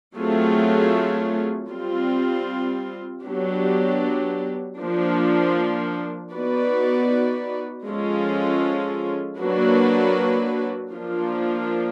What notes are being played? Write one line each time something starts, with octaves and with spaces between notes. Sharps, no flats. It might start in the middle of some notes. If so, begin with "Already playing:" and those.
F#3 A3 C4 F4 G#4
G3 C4 F4
F#3 B3 D4 G4
F3 A#3 D4
B3 D#4 F#4 B4 D5
F3 G#3 C#4 F4 A4
F#3 A#3 D4 F#4 B4
F3 A#3 D4 F4